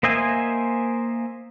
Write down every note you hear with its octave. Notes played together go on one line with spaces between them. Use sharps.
A#3 C5 D#5 E5 G#5